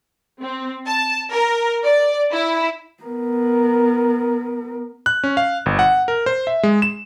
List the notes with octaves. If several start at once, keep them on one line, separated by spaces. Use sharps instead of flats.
C4
A5
A#4
D5
E4
B3 A#4
F#6
C#4
F5
G1
F#5
A#4
C5
E5
G#3
E7